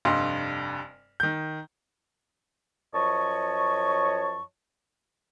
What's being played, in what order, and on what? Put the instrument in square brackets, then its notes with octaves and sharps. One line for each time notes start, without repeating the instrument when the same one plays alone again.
[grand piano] F1 G2 G3 D#5 F5 C6
D#3 G6
[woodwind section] F#2 F3 C#5 D#5 A5 C#6